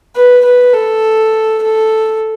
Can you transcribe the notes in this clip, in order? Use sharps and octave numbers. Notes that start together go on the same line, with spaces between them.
B4
B4
A4
A4